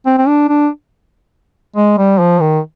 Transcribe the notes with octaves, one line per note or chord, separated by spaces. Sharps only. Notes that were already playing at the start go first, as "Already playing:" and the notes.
C4
C4
D4
D4
G#3
G3
F3
D#3